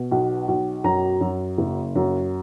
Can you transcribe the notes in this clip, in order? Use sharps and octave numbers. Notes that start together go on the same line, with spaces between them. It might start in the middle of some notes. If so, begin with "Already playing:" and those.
Already playing: B2
B1
B1
F#2 A#5
F#2
F#1
F#2